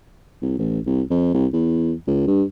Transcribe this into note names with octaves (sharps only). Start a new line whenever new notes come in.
C2
A1
C2
F2
C2
E2
C#2
G2